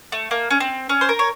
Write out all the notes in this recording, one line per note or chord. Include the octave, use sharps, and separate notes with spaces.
A3
A#3
C#4
C4
C#4
C5
A#4
C#5